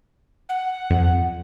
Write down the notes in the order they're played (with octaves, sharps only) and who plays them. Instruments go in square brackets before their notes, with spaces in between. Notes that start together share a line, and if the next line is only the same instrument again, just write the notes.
[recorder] F#5
[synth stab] F2